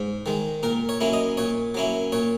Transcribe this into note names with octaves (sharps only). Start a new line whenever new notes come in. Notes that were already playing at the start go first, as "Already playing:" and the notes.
Already playing: G#2
D#3 G#3
A#2 A#4
C#5
F#3 A#3 C#4 E4
D#5
A#2 C#5
F#3 A#3 C#4 E4
A#2 C#5